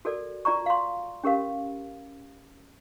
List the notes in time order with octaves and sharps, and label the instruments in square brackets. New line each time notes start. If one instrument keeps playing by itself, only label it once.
[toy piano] F#4 A4 A#4 D5
F4 D5 A#5 C#6
F5 C6
C#4 G4 A#4 F5